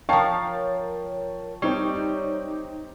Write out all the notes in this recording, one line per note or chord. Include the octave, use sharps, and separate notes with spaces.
F3 A#4 C#5 F5 G5 A5 C#6
G3 C4 D#4 G4 C#5